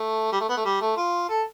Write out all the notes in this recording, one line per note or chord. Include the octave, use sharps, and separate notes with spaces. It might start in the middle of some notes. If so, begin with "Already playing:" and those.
Already playing: A3
G3
A3
B3
A3
G3
A3
F4
A4